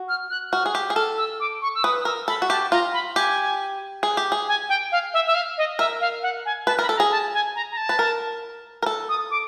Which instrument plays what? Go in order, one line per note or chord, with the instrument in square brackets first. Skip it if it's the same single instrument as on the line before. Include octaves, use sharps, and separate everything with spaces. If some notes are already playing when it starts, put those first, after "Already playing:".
Already playing: [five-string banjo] F#4
[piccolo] F6
F#6
[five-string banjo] F#4 [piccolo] F6
[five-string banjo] G#4
G4
G#4
[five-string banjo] A4 [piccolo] F6
[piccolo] E6
D6
C#6
E6
[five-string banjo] B4 [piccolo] D#6
[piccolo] D#6
[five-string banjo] A#4 [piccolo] E6
[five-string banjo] A4 [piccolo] B5
[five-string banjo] F#4
[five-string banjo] G4 [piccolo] A5
[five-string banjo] F4 [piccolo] A#5
[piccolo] B5
[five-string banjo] G4 [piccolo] G#5
[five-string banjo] G#4
G4
G#4
[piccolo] G#5
G5
F5
E5
E5
F5
D#5
[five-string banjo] A#4 [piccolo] E5
[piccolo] F5
F#5
G#5
[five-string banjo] B4 [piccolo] A5
[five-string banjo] A#4
[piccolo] B5
[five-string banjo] A4
[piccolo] A#5
[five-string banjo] G#4
[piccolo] A5
G#5
A#5
A#5
A5
[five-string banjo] B4
A#4
A#4
A4
[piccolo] D#6
D6